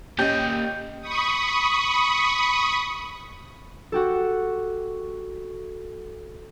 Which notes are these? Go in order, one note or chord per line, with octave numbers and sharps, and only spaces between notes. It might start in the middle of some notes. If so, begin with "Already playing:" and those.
A#2 C#4 G4 D#5 G6
B5 C#6 D#6
F#4 G4 A4